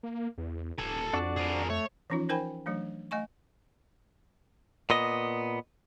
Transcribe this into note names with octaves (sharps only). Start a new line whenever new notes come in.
A#3
E2
D#1 A4 G#5
F2 D4 F#4 D5
G#4 A#4
A3 C#5
E3 F3 C#4 D#4 F4
D#4 A#4 C5 G5 G#5 B5
E3 F#3 A3 D4
A3 D#5 G#5 C#6
A#2 B3 D#5